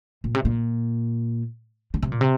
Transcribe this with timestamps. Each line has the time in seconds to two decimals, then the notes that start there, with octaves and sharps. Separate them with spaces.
0.24 A#2
0.35 C3
0.45 A#2
1.94 D3
2.03 C3
2.12 A#2
2.21 C3